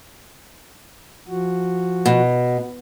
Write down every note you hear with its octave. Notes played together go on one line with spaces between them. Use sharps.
F3 F#4
B2